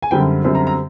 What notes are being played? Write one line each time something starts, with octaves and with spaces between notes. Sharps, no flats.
G#5
F#2 D3 G3 C4 G5
F#2 D3 G3 C4
A#5
A#5